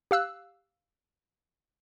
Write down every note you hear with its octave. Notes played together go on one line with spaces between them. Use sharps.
G4 F5 E6 F#6